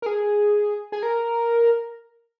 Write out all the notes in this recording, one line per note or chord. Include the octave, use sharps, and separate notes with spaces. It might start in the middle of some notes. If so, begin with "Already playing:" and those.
A#4
G#4
G#4
A#4